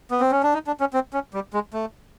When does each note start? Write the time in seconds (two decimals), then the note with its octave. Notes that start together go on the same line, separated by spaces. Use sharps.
0.11 B3
0.20 C4
0.31 C#4
0.43 D4
0.54 D#4
0.67 D4
0.80 C#4
0.94 C4
1.13 C#4
1.34 G3
1.54 G#3
1.74 A3